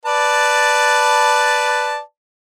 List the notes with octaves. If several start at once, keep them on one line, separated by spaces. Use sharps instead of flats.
B4 D5 A5